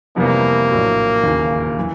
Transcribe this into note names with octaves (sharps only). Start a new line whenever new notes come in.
F2 C3 E3 G3 A#3 B3
A#1 A2 F#3
E1 D#2 C#3 E3
E3